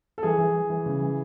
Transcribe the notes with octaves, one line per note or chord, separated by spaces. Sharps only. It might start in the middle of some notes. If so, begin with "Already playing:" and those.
A4
E3 G#4
E3
E3
E3
C#3
E3